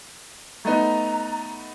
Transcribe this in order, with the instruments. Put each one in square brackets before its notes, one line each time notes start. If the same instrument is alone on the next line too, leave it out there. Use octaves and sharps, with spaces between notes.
[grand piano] A3 B3 D#4 [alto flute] A#5